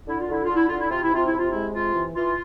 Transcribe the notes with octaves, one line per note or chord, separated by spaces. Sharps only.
D3 E4
F4
D3 E4
F4
D3
E4
D3 F4
E4
C3 F4
E4
C3 F4
E4
C3
F4
G#3 E4
C3 F4
E3
E3 F4